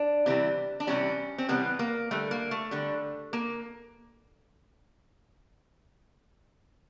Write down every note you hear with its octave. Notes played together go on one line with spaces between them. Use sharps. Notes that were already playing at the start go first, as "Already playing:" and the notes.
Already playing: D4
C3 E3 G3
D4
C3 E3 G3 C#4
C4
C3 E3 G3 B3
A#3
D3 G3 A3
A#3
A3
D3 G3
A#3